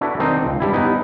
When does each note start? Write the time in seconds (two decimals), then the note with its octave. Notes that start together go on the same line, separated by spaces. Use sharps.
0.01 D4 E4 F#4 A4 B4
0.19 D#3 C4 D4 D#4
0.45 C#2
0.60 G2 G3 E4
0.73 B3 C#4 D#4 E4